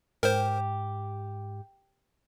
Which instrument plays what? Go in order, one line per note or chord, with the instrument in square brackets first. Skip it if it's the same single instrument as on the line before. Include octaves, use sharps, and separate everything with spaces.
[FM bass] G#2 [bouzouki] G4 [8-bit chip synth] A#4 C5